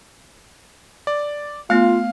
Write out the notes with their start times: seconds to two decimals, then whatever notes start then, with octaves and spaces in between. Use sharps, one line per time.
1.07 D5
1.70 A3 B3 F4 F5